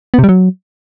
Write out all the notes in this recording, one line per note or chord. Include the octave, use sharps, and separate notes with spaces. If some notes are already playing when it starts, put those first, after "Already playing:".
B3
C3
G3
F#3